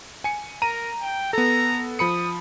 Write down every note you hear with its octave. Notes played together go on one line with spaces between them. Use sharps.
G#5 C#7
A#4 A#5 D#7
G5
B3 A4 A#5
F3 B5 D#6 C#7